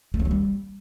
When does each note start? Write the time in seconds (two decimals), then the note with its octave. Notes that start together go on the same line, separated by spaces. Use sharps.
0.14 A3
0.20 C#4
0.25 F#3
0.31 G3